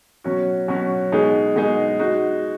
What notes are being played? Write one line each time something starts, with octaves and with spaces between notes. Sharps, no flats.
B2 F#3 C#4 F#4
B2 F#3 C#4 F#4
B2 G#3 D#4 G#4
B2 G#3 D#4 G#4
G#3 D#4 F#4